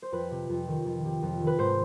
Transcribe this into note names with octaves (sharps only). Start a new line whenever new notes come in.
C5
F2 B4
C3
F2
D#3
F2
C3
F2
D#3
B4
G#2 C5